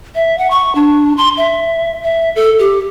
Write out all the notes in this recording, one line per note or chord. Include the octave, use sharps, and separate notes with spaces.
E5
F#5
C#6
D4
C6
E5
E5
A4
G4